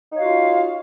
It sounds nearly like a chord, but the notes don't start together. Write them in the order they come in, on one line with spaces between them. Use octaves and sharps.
D#4 C#5 F5 F#4 F4